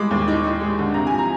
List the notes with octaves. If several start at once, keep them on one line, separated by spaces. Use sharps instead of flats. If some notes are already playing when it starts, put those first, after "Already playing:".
Already playing: G3 G#3 D6
D#2
D#4
D#4
G#3
D3
C3 A#5
G#5
F3
A#5